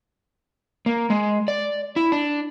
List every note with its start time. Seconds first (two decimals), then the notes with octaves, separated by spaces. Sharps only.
0.86 A#3
1.10 G#3
1.48 D5
1.96 E4
2.12 D4